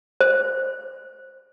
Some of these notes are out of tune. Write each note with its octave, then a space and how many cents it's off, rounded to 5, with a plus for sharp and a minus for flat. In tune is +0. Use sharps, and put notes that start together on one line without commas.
C5 +15